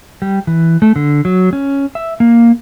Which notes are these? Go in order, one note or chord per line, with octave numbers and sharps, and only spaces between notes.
G3
E3
A3
D3
F#3
C#4
E5
A#3